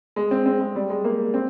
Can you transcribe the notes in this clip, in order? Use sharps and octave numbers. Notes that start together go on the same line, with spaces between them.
G#3
C4
C4
G#3
G3
G#3
A#3
C4